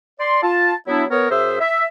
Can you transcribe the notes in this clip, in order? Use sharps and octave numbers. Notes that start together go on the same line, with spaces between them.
D5 C6
F4 A5
F#3 B3 D4 E4
B3 A#4 C#5
F#2 G#4 C5 E5
E5